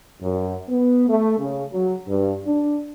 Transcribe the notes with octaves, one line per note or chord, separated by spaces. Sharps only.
F#2
B3
A3
C#3
F#3
G2
D4